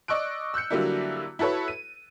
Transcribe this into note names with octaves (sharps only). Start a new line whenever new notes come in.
D5 D#5 C#6 E6 F#6 D7
E6 F#6 G6 C#7
D3 F#3 G3 A#3 D4 E4
E4 F#4 A4 B4 C#5
D#7